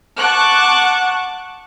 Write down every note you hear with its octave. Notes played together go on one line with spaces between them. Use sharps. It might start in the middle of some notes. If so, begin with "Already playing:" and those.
F#5 A5 C#6 D6 F#6